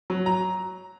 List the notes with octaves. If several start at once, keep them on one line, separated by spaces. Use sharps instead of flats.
F#3
A#5